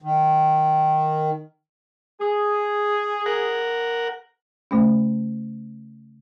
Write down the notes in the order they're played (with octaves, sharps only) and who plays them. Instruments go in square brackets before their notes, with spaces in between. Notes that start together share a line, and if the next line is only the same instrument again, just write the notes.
[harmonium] D#3
[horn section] G#4
[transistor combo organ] A#4 F#5
[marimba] C#3 A3 C#4